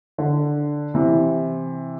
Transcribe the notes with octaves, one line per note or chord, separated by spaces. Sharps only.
D3
C3 E3